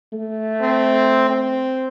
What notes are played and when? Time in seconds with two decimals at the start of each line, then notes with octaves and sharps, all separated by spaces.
0.13 A3
0.61 C4
1.30 C4